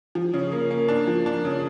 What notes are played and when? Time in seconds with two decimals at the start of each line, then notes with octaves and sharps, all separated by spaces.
0.15 F3
0.33 C#3
0.52 A#3
0.71 A#3
0.88 D4
1.07 F3
1.26 D4
1.45 C#3